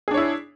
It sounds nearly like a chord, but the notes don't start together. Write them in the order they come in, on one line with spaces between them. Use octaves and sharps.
G#4 D4 C#5 E4